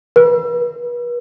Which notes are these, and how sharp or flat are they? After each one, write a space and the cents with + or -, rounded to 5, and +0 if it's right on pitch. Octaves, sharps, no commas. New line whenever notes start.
B4 -40